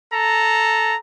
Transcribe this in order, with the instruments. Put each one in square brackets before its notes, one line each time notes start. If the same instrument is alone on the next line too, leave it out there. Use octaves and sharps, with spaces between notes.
[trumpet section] A4 A#5